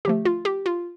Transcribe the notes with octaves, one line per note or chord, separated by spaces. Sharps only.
D3 F3 A3 G4
F4
G4
F4